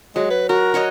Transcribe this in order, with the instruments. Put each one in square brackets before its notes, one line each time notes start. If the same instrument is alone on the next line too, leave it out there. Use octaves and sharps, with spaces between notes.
[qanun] F#3 [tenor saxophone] G#3
[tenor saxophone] B4
[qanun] F#4 [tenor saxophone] A#4
[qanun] F#4 C#5 D#5